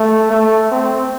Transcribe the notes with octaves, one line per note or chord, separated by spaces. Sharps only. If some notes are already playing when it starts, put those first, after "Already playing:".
Already playing: A3
A3
C4